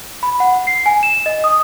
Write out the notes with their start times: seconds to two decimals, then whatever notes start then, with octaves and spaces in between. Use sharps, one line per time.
0.23 B5
0.40 F#5
0.67 C7
0.86 G#5
1.03 E7
1.26 D#5
1.44 D#6